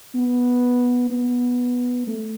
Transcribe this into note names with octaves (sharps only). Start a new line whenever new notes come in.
B3
B3
A3